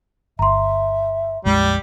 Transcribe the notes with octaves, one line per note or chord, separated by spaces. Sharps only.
G1 E5 A#5 C6
A#1 F2 G3 G#3